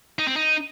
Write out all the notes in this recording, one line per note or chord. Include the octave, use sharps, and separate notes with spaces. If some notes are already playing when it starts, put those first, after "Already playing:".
D#4
C4
D#4